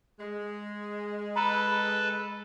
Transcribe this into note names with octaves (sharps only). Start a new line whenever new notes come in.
G#3
A4 B4 A#5 B5 E6